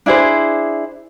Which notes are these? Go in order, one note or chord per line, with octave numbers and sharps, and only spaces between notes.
D4 E4 G#4 C5